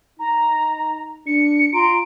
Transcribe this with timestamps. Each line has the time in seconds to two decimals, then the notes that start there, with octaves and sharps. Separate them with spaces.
0.19 D#4 A#5
1.27 D4 C#7
1.73 F4 A#5 C6 D7